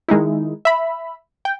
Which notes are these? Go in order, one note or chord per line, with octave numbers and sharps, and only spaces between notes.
D#3 G#3 D#4 E4
E5 B5
G5